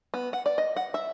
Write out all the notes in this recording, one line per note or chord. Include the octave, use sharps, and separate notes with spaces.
B3
F#5
D5
D#5
F#5
E5